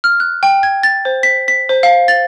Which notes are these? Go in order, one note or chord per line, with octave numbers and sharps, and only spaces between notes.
F6
F#6
G5
G#6
A6
C5
B6
B6
C5
F5
A6